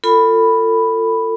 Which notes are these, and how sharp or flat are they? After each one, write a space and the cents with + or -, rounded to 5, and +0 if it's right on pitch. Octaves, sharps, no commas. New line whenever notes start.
F4 +0 A4 +30 B5 +0